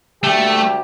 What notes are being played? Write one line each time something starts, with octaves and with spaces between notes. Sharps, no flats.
D2 A3 G4